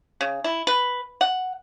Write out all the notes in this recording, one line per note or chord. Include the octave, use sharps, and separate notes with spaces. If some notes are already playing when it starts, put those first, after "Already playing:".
C#3
E4
B4
F#5